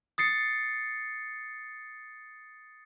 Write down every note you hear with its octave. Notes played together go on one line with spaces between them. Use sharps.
D#6 A6 C7 C#7